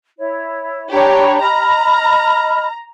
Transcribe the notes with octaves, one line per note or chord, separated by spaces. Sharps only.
E4 C#5
D4 G4 C#5 A#5 B5
D#5 A#5 B5 F6